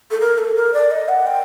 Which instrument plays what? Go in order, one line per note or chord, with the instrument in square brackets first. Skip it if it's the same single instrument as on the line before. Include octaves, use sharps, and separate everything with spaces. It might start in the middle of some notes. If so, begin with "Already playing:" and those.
[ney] A4
A#4
A4
A#4
D5
D#5
F#5
G5